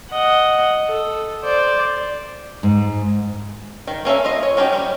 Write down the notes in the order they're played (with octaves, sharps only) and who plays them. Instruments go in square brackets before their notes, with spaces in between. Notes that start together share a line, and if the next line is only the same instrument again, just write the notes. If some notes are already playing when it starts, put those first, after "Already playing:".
[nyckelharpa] D#5 F#5
A4
C5 D5
[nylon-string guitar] G#2
[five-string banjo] D#3
A#3 C#4 A4 E5
F4 D#5
C#5
F#3 C#4 D#4 G4
G3 C#4